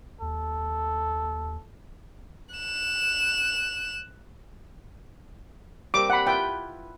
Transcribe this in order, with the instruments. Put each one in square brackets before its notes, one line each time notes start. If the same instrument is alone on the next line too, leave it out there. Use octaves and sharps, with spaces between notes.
[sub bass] D#2 [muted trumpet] A4
[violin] F#6 E7
[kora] G3 A#3 C4 [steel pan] D6
[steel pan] F#5 B5
[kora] E4 F4 B4 [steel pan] G5